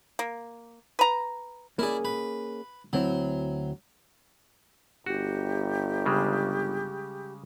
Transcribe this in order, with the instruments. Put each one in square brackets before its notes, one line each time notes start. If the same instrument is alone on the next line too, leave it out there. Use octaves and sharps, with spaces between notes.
[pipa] A#3
B4 A#5
[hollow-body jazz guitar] A#3 C#4 G#4 [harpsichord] E4 D5
[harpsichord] B4
[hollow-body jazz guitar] D2 C4 E4 [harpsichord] F#3
[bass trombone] G1 [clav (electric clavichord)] F#4 [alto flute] G4
[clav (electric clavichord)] C#3 G3 G#3